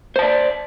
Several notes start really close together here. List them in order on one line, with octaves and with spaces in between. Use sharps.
C5 A5 D5